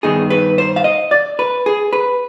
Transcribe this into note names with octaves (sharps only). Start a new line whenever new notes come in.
G2 D#3 B3 D#4 G#4
B4
C5
F5
D#5
D5
B4
G#4
B4